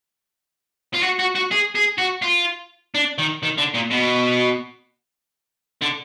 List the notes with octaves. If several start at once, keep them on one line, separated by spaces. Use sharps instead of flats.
F4
F#4
F#4
F#4
G#4
G#4
F#4
F4
D4
D#3
D#3
D3
A#2
B2
D3